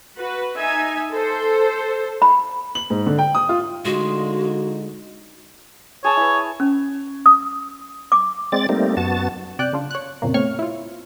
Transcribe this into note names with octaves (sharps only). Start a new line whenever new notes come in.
F#4 B4
D#4 E5 G#5
A4 C5
B5
F#7
G#2
D3
G5
D#6
F4
D3 G#3 D#4 F4 F#4
G#4 C#5 A5 E6
E4 B4
C#4
D#6
D6
G#3 C4 D5 A6
G3 A3 A#3 C4 D#4
F#2 B3 F#4 A5 A6
C3 D5 G5 F#6
C#3 D4 F4
C#5 F#6
F2 A#2 C#3 A#3
B2 A3 C4 C#5 C#6 F6
E4 F4